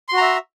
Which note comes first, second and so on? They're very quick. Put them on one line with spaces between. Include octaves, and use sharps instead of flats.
C6 F#4 A#5 E5